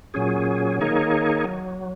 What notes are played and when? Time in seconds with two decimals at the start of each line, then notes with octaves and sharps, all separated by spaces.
0.14 A#2 F#3 C#4 G#4
0.79 D#3 A#3 D#4 G#4 C#5
1.45 F#3